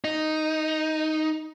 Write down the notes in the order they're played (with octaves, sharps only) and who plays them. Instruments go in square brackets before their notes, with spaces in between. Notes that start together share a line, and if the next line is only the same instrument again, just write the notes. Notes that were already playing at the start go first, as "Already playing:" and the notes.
[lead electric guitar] D#4